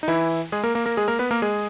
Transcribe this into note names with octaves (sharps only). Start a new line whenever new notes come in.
D#4
E3 E4
G#3 G#4
A#3 A#4
A#3 A#4
A#3 A#4
G#3 G#4
A#3 A#4
B3 B4
A#3 A#4
G#3 G#4